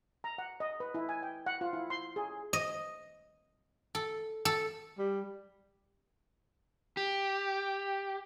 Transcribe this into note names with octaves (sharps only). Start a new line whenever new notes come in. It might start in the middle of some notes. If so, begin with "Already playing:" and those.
A#5
F#5
D#5
B4
E4
G#5
G5
F#5
F4
E4
C6
G#4
D#5
A4
A4
G3
G4